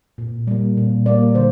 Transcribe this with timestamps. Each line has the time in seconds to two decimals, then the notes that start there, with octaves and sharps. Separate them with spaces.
0.18 A#2
0.47 G3 A#3
0.77 A#2
1.06 G3 A#3 D5
1.35 D3 C5